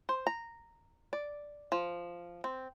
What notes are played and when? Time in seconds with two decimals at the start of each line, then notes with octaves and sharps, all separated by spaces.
0.09 C5
0.27 A#5
1.13 D5
1.72 F3
2.44 C4